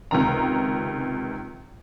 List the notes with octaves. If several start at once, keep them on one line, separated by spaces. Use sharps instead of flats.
C#2 C3 D#3 A#5